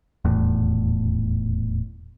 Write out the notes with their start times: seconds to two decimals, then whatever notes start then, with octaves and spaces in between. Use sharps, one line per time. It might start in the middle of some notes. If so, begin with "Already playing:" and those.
0.25 D#1 E2 A2